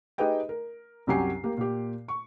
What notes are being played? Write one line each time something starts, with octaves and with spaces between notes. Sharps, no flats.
D#4 G4 G#4 B4 D#5 G5
A#4
C2 F#2 F#3 G4 G#5 C7
A#3 G4
A#2 G4
C#6